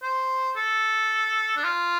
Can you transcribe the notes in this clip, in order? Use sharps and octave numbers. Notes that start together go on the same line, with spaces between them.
C5
A4
D4
F4